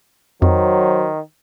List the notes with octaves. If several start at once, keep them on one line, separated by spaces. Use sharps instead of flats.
F2 D#3 F#3 C5